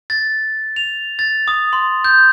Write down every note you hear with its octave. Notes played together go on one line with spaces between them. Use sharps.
A6
F7
A6
D#6
C6
G6